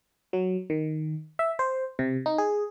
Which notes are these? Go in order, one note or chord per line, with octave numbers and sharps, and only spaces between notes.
F#3
D#3
E5
C5
C3
D#4
G#4